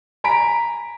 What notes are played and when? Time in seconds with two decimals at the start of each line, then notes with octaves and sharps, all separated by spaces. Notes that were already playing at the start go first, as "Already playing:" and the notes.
0.24 G#5 A#5 B5 B6 D7